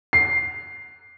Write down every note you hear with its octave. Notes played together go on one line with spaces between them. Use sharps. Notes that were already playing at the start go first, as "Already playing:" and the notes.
C7